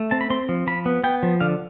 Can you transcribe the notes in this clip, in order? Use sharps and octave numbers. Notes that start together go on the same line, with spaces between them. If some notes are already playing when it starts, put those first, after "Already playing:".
Already playing: A3
C4 A5
B5
C4 C6
F3
F3 B5
B3
B3 G5
F3
D3 F5